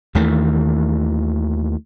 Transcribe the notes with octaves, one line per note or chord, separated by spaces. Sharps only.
D#2 D#3 E3 A3